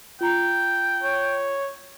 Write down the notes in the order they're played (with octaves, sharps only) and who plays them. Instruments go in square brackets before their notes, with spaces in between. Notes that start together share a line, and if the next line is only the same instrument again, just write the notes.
[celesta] F4 A#5 [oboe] G5
[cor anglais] C#5